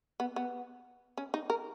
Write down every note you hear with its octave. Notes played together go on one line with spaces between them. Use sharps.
B3
B3
C#4
D#4
A#4